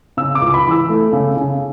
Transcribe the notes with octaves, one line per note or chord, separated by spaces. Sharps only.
C#3 E6
D6
C#2
B5
E3 E6
A3
C#3
C#3